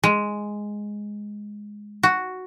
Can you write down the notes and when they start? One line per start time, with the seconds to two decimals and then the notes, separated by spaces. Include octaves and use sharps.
0.04 G#3
2.03 F#4